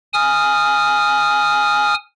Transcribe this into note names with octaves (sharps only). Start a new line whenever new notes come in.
G#5 D#6 F6